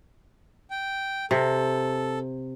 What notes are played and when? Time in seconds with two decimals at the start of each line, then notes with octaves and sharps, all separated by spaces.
0.71 G5
1.31 C3 A4